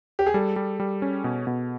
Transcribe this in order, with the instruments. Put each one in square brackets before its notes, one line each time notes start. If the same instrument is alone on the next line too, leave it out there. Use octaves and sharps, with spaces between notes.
[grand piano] G4
G#4
[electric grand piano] G3 [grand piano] A4
[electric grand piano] G3
G3
C#4
B2
B2